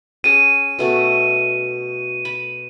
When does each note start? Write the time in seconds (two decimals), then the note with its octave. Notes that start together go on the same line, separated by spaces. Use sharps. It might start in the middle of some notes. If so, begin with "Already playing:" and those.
0.24 C#4 G#4 D#7
0.79 B2 A3 F#4
2.25 B5